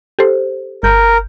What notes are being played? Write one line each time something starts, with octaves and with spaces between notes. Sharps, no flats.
G4 A4 C5
G1 A#4 G6